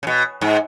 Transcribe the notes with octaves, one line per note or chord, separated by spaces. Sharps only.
C#3
B2
G#2